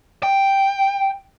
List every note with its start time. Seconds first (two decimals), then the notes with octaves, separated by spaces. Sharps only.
0.23 G5